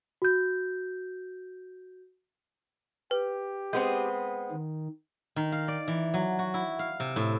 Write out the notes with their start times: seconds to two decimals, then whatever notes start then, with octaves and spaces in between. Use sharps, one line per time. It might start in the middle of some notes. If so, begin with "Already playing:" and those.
0.22 F#4 G6
3.11 G4 B4
3.73 G#3 B3 C4 G6
4.51 D#3
5.36 D#3
5.52 F5
5.68 D5
5.88 E3
6.14 F#3
6.39 F#4
6.54 E4
6.79 F5
7.00 C3
7.16 A2